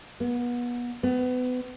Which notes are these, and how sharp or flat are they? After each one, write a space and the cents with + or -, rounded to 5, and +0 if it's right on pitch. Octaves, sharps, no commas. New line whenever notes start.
B3 -30
B3 +30